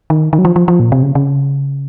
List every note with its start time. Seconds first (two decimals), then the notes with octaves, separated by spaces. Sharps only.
0.10 D#3
0.33 D#3
0.38 F#3
0.45 F3
0.56 F3
0.68 F3
0.80 A#2
0.92 C3
1.03 C#3
1.15 C#3